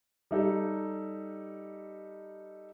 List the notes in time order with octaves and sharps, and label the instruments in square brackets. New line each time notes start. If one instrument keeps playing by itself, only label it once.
[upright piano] G3 D#4 A4